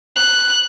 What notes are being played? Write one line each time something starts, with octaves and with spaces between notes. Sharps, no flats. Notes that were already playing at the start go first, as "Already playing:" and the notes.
F#6